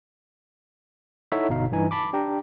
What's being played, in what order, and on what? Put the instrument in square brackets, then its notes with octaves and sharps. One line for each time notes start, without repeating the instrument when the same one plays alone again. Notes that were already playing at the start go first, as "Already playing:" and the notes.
[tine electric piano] D#4 E4 A4 C#5 E5 F#5
G1 B2 D#4 F5
G2 E3 D#4 G#5
A5 B5 D6
D4 G4 G5 A#5